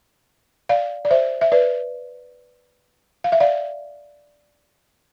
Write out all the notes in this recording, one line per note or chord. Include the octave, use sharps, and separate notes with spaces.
D5 F5
D5
C5 E5
E5
B4 D5
F5
E5
D5 F5